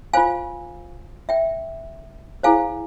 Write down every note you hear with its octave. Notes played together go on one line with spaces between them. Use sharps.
F4 C5 F5 G#5
E5 G5
E4 G#4 C5 F5 G#5